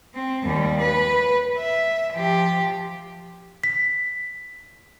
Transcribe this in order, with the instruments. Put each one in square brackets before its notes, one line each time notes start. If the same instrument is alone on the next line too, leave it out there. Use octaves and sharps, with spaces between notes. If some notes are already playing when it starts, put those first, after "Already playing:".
[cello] C4
D#2 G3
B4
E5
F3 G4
[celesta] B6